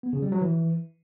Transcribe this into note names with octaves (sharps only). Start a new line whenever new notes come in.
B3
C#3
G3
F#3
E3